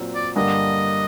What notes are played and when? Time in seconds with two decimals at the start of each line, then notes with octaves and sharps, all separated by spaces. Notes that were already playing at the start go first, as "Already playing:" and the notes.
Already playing: A#2 F#3 C4
0.15 D5
0.36 G2 D3 G3 A#3 D4 D#5